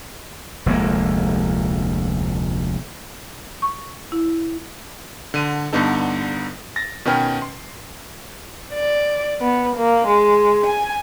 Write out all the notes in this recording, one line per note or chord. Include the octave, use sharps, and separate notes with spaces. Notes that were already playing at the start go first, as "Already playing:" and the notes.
F1 D2 G#3 A#3
C#6
E4
D3 D#7
G2 D3 B3 D#4 A4
A6 A#6
B2 D#3 C#4 B4 G5 F6
C6
D5
B3
A#3
G#3
G#5